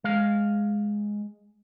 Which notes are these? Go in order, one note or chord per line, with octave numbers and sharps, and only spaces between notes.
G#3 F5